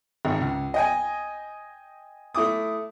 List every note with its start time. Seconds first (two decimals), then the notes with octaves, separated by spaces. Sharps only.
0.25 G#1 G#2
0.41 C#2
0.74 D#5 G5 G#5
2.35 A3 E4 D6 D#6